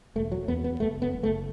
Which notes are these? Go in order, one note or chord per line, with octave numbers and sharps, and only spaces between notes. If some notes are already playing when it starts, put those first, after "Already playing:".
E1 A3
F#3
E2 B3
B3
F#1 A3
B3
F#1
A3